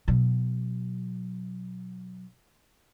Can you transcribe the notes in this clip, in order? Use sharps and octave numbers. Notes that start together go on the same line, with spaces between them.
B2 F#3